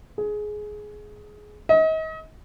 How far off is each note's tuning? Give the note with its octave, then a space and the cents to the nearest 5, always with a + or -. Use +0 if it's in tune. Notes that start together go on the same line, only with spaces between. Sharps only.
G#4 +15
D#5 +35